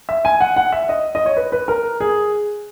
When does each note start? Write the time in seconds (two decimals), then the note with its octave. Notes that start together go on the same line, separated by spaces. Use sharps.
0.09 E5
0.25 G#5
0.40 F#5
0.56 F#5
0.72 E5
0.89 D#5
1.15 D#5
1.26 C#5
1.37 B4
1.52 B4
1.68 A#4
2.00 G#4